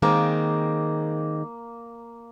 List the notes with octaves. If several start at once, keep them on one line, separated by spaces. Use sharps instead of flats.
D#3 G#3 A#3 C4